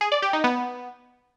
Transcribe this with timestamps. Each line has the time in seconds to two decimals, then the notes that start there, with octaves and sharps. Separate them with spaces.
0.01 G#4
0.12 D5
0.22 G4
0.33 D#4
0.44 B3